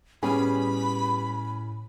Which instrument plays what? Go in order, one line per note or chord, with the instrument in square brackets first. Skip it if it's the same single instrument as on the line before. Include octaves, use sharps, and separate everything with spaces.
[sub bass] A2 [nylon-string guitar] G3 B3 G#4 [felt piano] C#4 [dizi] B5